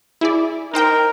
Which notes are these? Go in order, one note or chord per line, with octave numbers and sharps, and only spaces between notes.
E4 G#4 D5
D#4 A#4 C5 G5